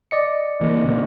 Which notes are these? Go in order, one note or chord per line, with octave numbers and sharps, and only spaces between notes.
D5 D#5 C#7
E3 A#3
A#2 C#3